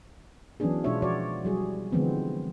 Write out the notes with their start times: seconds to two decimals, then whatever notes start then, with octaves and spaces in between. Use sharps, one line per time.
0.60 E3 F#3 B3 C#4 D4 G#4
0.84 B2 G#3 D4 F4 C#5 E5
1.02 F3 F#4 C#5 D5
1.45 F#3 G3 G#4
1.92 D3 E3 F3 G#3 B3 C4